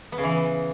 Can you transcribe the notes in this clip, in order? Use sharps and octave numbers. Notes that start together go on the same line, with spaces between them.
B3
C#3
E3